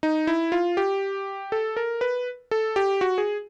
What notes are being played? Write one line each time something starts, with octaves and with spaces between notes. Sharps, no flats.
D#4
E4
F4
G4
A4
A#4
B4
A4
G4
F#4
G#4